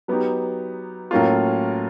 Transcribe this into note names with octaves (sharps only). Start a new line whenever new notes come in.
F#3 B3 D#4 G4
A2 F#3 A#3 C#4 F4